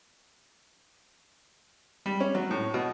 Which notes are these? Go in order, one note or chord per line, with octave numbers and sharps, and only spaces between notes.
G3
C#4
F#3
A2
B2